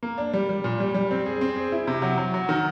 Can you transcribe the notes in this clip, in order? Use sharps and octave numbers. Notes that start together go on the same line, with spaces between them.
A#3
D4
G3
G3
A#2
G3
G3
C4
G#4
C4
G#4
E4
C3
F#3
F#3
F#3
D#3